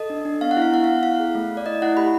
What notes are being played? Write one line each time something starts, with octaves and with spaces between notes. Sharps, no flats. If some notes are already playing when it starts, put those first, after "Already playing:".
Already playing: A4 D#5
D4
D4
B3 F5
F#5
E4
F5
B3 F#5
B3 F5
E4 F5
G#4
A3
A3
D5
E4 D#5
E4 F#5
G4 B5